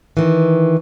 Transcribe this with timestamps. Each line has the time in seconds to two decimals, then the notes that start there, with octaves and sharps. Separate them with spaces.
0.17 D#3 E3